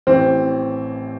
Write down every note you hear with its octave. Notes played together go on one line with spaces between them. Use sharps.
A1 A2 E3 C4